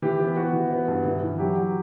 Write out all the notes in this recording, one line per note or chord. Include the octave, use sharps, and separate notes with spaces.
E3 G4
B3
B3 F#4
E3
B3
G2
E3
E3
F#3 G4
F#3